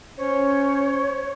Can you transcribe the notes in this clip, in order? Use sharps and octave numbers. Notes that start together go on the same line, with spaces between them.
C#4 C5 C#5